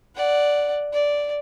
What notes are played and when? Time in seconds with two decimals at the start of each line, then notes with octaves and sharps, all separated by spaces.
0.16 D5 F#5
0.93 D5